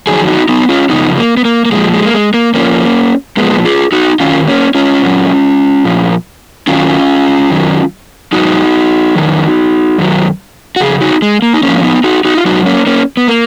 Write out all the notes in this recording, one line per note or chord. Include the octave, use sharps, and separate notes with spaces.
F2 D#3 F#3 G#4
D#4 F#4
B3 D#4
C#4 F4
F#2 C#3 F3 B3 D#4
A#3
B3
A#3
A#3
A#2 F3 G#3
G#3
A#3
G#3
A#3
F2 F3 A#3 C#4
A#2 F3 G#3 B3
F4 G#4
D#4 F#4
F#2 D#3 F#3 C#4 F4
A#3 C#4
C#4 F4
A#2 F#3
A#2 F3
F#2 D#3 F#3 C#4 F4
F#2 D#3 F#3
G#2 F#3 D#4 F#4
F2 D#3 F#3
F#2 D#3 F#3
F#4
F2 C#3 G#4
D#4 F#4
G#3
A#3
D#4
G#2 F3 A#3 C#4
C#4
B3 D#4
D#4 F#4
D#4 F#4
F4
G#2 F#3 D#4 F#4
A#3 C#4
A#3 C#4
B3
A#3